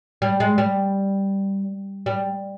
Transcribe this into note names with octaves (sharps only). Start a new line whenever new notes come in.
G3
G#3
G3
G3